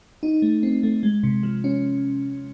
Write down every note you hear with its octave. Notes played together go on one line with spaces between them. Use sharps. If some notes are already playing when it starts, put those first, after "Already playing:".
D#4
A3
C4
A3
G#3
C3
F3
C#4